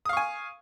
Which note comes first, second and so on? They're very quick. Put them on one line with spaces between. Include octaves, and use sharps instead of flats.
D#6 F5 C#6 G#5